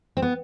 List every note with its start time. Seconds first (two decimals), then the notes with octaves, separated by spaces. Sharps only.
0.17 C4
0.22 B3